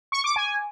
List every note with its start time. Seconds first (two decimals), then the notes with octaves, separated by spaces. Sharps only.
0.12 C#6
0.24 D6
0.36 G#5